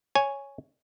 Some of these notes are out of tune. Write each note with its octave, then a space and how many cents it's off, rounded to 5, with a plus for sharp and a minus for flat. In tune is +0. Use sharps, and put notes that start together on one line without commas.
C#5 +0 G#5 +0